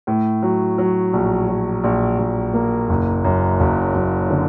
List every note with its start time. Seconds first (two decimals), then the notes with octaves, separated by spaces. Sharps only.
0.07 A2
0.42 F#3
0.78 F#3
1.13 A#1
1.49 F#3
1.84 A#1
2.18 A#1
2.54 A#3
2.89 F#1
3.24 F#2
3.60 F#1
3.95 F#2
4.30 D3